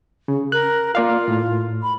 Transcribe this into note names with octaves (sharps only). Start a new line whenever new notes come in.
C#3
A#4 F#6
A#3 F4 D5 F5
A2
B5